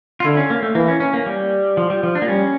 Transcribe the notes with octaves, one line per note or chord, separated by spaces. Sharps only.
F4
D3 E4
C#4
A#3
A3
E3 A#3
C#4
C#4
A#3
G3
F3
G3
F3
D4
A#3
G3 C#4